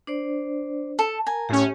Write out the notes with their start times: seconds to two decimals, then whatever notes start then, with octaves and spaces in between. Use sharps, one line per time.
0.07 D4 C5 D5
0.99 A4
1.27 A#4 G#5 A#5
1.49 A2 C#4 G4